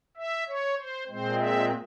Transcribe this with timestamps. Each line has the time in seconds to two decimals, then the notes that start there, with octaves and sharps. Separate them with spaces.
0.17 E5
0.47 C#5
0.77 C5
1.07 A#2 G#3 C4 C5
1.38 E5